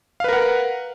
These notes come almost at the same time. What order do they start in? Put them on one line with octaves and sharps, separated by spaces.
F5 B4 A#4 F#5